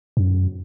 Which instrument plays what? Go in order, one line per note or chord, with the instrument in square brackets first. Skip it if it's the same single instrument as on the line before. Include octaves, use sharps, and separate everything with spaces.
[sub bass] F#2